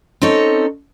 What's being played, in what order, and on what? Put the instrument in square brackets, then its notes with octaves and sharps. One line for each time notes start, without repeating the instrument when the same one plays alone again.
[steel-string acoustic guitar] C4 C#4 D#4 A4 C#5